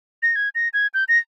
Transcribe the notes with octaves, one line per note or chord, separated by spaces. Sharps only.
A#6
G#6
A#6
G#6
G6
A#6